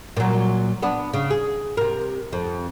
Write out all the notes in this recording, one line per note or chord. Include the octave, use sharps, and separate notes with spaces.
A#2 F#3
B3 D4
C#3
G#4
C3 A#4
F2